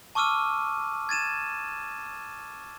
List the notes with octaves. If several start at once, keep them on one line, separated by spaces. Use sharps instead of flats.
A5 C#6 D6 E6 F6 D#7
G#6 A6 D#7 E7